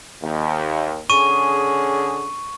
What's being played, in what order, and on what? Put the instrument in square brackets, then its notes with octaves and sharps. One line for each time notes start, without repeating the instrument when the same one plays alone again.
[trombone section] D#2
[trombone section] D3 C#4 G#4 [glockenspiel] C#6 D#7